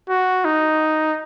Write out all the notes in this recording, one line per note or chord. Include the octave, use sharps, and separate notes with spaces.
F#4
D#4